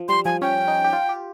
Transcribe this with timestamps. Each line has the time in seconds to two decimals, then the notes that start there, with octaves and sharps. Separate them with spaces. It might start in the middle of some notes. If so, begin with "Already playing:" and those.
Already playing: F3
0.08 G3 C6
0.25 F3 G#5
0.42 C#4 G5
0.68 D#4
0.84 G4
0.93 F4
1.09 G4